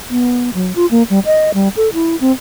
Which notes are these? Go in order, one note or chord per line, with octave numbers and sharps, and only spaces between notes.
B3
F#3
F4
A#3
G3
D#5
G3
A4
E4
C4